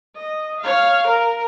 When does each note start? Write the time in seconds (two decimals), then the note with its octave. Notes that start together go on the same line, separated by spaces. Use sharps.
0.16 D#5
0.61 C#5 F5
1.08 A#4